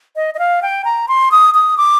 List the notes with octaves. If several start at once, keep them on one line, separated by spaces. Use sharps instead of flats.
D#5
D#5
F5
G5
A#5
C6
D#6
D#6
D6